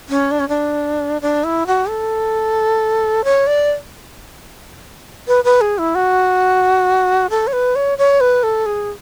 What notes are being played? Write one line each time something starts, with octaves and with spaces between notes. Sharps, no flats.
C#4
D4
C#4
D4
D4
E4
F#4
A4
C#5
D5
B4
B4
G#4
E4
F#4
A4
C#5
B4
C#5
C#5
B4
A4
G#4